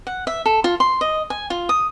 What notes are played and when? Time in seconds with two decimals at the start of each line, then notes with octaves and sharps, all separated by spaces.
0.07 F#5
0.27 E5
0.46 A4
0.64 F4
0.80 C6
1.01 D#5
1.30 G#5
1.50 F4
1.69 D#6